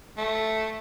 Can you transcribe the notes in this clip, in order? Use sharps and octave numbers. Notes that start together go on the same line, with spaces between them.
A3